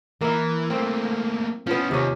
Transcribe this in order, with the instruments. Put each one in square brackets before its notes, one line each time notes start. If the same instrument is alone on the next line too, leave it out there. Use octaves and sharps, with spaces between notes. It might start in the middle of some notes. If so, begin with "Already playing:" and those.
[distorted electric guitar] E3 [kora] A#3 E4
[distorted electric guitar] A3 A#3 [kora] C4
[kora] F3 B3 [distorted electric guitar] C#4 E4
[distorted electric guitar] D#2 [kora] C3 C#4